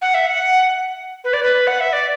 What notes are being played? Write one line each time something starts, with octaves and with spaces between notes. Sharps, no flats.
F#5
E5
F#5
B4
D5
B4
F#5
E5
D5